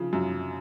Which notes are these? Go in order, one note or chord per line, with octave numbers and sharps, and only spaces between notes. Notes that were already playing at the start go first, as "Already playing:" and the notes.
Already playing: C#3 F3
F#2